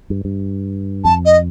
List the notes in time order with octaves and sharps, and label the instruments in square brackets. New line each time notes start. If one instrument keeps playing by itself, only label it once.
[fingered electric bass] G2
G2
[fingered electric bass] F2 [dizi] A5
[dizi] D#5